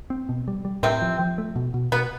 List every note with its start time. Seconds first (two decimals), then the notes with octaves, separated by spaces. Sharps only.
0.10 C4
0.29 B2
0.48 G3
0.65 G3
0.83 A2 C3 C4
1.02 F3
1.19 F3
1.38 A3
1.56 B2
1.74 B2
1.92 B2 B3